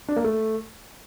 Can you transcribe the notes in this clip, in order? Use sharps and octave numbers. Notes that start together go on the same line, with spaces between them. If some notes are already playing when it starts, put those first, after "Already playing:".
D4
A#3
A3